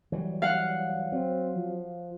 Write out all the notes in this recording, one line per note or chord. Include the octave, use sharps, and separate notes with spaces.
E3 F#3 G3
F5 F#5
F#3 C4
F3